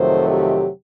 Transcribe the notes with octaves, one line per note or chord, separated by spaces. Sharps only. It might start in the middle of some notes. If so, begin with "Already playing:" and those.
Already playing: F2 C3 D#3 F#3 A3 C5
G4